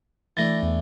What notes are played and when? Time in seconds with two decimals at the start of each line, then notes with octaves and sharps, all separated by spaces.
0.37 E3 A3 D4 A6 A#6
0.63 E2